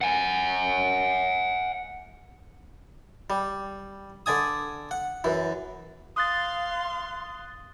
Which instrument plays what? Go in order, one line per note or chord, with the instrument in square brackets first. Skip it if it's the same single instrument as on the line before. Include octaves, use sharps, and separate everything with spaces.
[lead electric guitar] F#5 G#5
[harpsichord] G3
D3 D5 G#5 D#6
F#5
F#2 E3
[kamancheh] F5 C6 [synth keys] D#6 F#6 A6